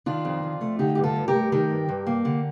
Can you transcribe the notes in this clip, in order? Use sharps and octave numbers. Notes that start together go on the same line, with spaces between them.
D#3 D4 F4
F2
F2
A3
D3 D#4 G4
G2 G4
F4 A4
G2
G4 A#4
A3
D#3 G4 A#4
G2
G2
A#3
D3